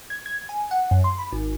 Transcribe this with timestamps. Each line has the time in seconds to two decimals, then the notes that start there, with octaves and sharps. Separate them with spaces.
0.10 G#6
0.26 G#6
0.49 G#5
0.71 F#5
0.91 F#2
1.04 C6
1.18 B5
1.32 G#1